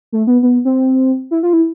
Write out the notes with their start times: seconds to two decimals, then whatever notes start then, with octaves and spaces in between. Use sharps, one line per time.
0.12 A3
0.27 B3
0.43 B3
0.65 C4
1.31 E4
1.43 F4
1.53 E4